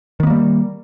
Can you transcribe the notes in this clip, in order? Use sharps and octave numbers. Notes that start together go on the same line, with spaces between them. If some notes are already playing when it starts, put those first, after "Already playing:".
D#3 G3 A#3 B3